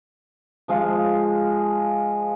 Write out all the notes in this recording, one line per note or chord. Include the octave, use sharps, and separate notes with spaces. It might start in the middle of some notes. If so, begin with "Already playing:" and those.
F3 G#3 F4 F5